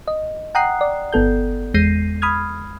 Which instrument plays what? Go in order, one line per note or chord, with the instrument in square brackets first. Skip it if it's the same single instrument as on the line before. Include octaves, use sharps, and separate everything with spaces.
[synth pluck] D#5
F#5 G5 A#5 D#6 F#6 C7
D5
G1 B3 A4 G6
E2 G#3 G6 A#6 C7 D#7
B5 D#6 F6 G#6